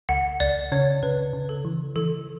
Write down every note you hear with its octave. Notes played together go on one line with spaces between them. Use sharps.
C#2 F#5
C#2 D5
C#3 C#5
C#3 B4
C#3
A4
E3
E3 A4